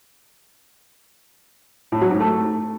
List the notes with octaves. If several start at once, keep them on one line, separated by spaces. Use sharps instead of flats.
A2
F#3
G#2
A3